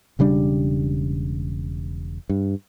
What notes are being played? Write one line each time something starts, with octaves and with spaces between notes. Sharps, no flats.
E1 C#3 G3 D4
G2